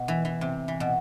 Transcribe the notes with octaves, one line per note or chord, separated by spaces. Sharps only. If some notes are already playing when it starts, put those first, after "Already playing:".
Already playing: B2
E3
E3
C3
E3
B2